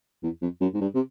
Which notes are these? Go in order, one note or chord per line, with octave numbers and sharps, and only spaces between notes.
E2
F2
F#2
G#2
G2
C3